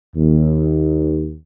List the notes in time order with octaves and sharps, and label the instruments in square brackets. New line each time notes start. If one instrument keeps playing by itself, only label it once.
[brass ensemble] D#2